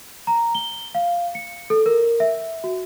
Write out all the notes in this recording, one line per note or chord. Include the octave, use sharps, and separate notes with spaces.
A#5
G7
F5
C#7
A4
A#4
E5
F#4